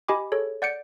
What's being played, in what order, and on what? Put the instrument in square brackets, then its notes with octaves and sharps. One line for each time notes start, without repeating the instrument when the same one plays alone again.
[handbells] G4 D#5 G#5 B5 D6
G#4 A4 C#5
D5 F#5 G6 A6 C#7 D7